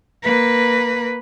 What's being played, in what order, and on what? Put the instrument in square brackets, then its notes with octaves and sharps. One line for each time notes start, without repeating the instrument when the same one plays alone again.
[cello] A#3 B4